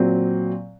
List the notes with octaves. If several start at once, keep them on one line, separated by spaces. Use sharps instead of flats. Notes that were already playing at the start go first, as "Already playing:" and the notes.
Already playing: A#2 F#3 C4